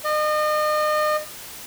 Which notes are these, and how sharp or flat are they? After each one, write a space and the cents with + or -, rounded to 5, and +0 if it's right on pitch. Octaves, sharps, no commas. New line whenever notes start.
D#5 -35